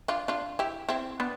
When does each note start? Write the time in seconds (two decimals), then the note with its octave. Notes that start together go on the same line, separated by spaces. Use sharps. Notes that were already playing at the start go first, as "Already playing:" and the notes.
0.08 D4 F4
0.28 D4 F4
0.59 E4 G4
0.89 C4 E4
1.20 B3 D4